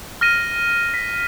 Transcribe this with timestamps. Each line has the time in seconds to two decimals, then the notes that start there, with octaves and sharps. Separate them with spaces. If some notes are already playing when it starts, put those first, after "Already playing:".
0.21 F6 A#6 D#7
0.94 B6